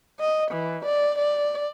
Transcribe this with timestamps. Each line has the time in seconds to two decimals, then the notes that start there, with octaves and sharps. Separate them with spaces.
0.21 D#5
0.52 E3
0.86 D5
1.19 D5